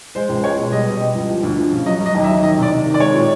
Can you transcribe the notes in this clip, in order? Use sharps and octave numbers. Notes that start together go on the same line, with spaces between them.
G#3 C5
C#2
G#3 C#5
B2
G3 D#5
B2
G3
C#2
F3
D2
F3
C#3
F#3 D#5
F#3 D#5
D#2
E5
F#3
D#3 D#5
C3
D5
C3
D#3
D5
G#3 C#5
A#2